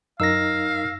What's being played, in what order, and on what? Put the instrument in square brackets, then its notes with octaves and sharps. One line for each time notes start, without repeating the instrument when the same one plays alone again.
[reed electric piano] F#2 D#4 A#4 [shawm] F5 [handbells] E6 A#6